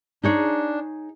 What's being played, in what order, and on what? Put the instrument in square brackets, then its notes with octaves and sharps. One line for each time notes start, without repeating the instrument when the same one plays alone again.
[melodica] D4 [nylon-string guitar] D#4 G#4 C#5